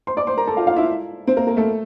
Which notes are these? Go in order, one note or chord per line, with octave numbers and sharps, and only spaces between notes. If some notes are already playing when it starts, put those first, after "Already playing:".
C5 C6
D5 D6
C5 C6
A#4 A#5
A4 A5
F4 F5
F4 F5
E4 E5
C4 C5
A#3 A#4
A#3 A#4
A3 A4